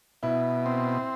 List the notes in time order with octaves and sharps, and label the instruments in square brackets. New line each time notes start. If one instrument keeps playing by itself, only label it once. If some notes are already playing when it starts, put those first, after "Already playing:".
[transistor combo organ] B2 [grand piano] E4
[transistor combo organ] C4